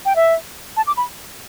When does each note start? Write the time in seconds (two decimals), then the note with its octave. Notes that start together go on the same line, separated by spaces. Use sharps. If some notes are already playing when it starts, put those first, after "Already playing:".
0.05 G5
0.16 E5
0.77 A5
0.87 D6
0.97 B5